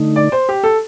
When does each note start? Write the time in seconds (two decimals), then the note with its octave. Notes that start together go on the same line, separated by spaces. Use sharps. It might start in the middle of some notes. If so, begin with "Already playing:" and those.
Already playing: D3 A3 D#4
0.16 D5
0.32 C5
0.49 G4
0.64 A4